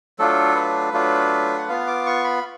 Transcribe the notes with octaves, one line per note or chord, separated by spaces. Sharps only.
F#3 A3 D4 F4 A4
B4
F#3 A3 D4 F4
F#5
B3 F4 F5
D6
C#6
B5